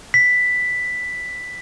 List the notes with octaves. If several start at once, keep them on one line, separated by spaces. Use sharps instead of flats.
B6